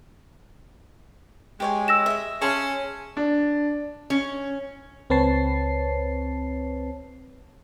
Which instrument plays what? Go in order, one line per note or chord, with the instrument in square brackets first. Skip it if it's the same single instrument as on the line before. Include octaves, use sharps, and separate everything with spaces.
[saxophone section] G#3 [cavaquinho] G4 C#5 G#5
[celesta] E6 A#6 E7
[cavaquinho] D#5 E5
[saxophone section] C#4 [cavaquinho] G#4 A5 C6
[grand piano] D4
[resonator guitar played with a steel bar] C#4
[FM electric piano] C#2 C4 B4 C#5 A5 C7